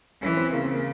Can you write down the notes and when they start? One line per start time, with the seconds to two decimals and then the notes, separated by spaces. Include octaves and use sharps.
0.22 E3 C#4
0.37 C4
0.52 C#3 A#3
0.63 C4
0.73 A#3